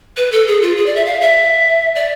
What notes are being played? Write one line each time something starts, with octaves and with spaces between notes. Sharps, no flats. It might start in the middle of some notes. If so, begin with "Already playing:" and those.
B4
A4
G#4
F4
G#4
D5
E5
F5
E5
D5